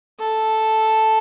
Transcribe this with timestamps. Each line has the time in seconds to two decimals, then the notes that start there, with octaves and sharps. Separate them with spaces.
0.20 A4